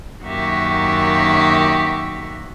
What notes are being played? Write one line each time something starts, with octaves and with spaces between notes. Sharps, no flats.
F#2 D#3 A#3 F#4 G4 E5